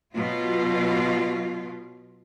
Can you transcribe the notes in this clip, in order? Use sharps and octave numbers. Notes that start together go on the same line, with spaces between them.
B2 F#3 F4